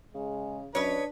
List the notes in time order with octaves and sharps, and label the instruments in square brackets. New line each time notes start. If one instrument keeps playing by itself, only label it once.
[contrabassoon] C#3 [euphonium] G#3
[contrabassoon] F#2 [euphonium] D4 [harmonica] B4 [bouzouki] C#5 D#5